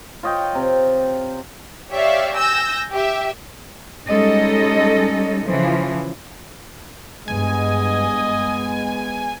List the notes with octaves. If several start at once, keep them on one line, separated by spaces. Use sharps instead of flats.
F4 C#5 D#5 G5
C3
G4 C#5 D5 E5 F5
G#5 E6 G6 A#6
G4 E5
G3 G#3 C#4 D#4 A4 D#5
C#3 E3 F3
G2 G#3 B3 D#5 G#5